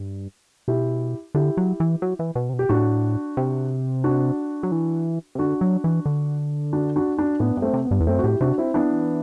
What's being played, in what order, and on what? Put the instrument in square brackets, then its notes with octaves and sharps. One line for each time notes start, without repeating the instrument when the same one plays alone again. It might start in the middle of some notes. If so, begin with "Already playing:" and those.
Already playing: [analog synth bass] G2
[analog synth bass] B2 [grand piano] E4 G4
[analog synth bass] D3 [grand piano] E4 G4
[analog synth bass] F#3
E3
F#3
E3
B2
C3
B2
[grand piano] G4
[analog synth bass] A2 [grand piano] D4 F#4
[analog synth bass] C3
[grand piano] D4 F#4
[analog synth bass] F#3
E3
C3
[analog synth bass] D3 [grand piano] D4 F#4
[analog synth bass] F#3
E3
D3
[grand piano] D4 F#4
D4 F#4
D4 F#4
[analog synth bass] A2 [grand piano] B3 D4
[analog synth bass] G2
[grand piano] A3 C4
[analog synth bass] C3
[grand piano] B3
[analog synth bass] G2
E2
[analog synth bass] F#2 [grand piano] A3 C4
[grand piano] F#4
[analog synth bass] A2 [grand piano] E4 G4
[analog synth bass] C3 [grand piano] D4 F#4
[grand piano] C4 E4
[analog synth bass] E3 [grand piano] B3 D4